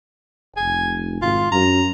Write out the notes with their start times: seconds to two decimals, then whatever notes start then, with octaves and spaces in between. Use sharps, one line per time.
0.57 F1 G#5
1.22 G#1 F4
1.52 F#2 A#5